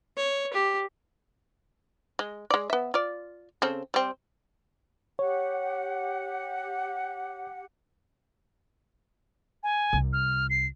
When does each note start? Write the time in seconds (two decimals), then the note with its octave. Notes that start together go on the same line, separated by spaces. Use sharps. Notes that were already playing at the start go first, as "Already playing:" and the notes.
0.17 C#5
0.53 G4
2.19 G#3
2.50 G#3 D5
2.70 B3 E5
2.94 F4 D5
3.62 C#3 C4 A4
3.94 G3 C4
5.19 G4 C#5 F#5
9.63 G#5
9.93 C2
10.13 F6
10.50 C7